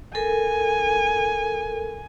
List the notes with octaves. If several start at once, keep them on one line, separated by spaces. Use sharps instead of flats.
A4 A#4 G#5